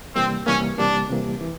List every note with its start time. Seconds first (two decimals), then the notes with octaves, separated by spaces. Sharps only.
0.15 C3 E3 G3 A#3 C4
0.46 C3 E3 G3 A#3 C#4
0.78 C3 E3 G3 A#3 D4
1.09 C3 E3 G3 A#3
1.41 E3